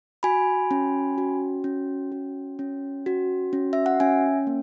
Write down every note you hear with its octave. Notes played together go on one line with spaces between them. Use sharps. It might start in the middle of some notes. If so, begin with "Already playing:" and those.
F#4 G#5 B5
C#4
F#4
C#4
F#4
C#4
F#4
C#4
E5
F#5
C#4 E5 G#5
A#3